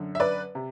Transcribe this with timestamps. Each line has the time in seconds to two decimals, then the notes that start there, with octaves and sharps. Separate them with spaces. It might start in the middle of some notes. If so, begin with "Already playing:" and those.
Already playing: F#2 D3
0.15 E5
0.20 B4 D5
0.55 C3